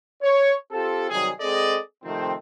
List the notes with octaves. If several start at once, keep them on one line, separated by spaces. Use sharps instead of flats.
C#5
C4 F4 G4 A4
C3 D#3 F#3 G3 G#4
G#3 C4 G#4 A4 D5 D#5
C3 D#3 F3 A3 C4